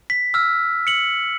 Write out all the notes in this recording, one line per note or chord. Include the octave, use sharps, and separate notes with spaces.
B6
E6 F6
C#7 F#7